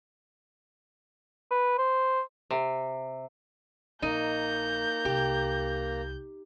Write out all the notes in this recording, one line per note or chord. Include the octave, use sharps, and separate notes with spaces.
B4
C5
C3
A#1 A#3 D#4 A#5 G6
C2 G4